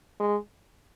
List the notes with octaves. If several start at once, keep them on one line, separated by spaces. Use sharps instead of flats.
G#3